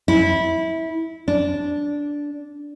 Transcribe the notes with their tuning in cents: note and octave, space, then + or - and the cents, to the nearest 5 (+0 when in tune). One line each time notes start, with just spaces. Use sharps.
E4 -20
D4 -10